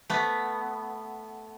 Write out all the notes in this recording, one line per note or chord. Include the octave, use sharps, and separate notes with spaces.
A3 B3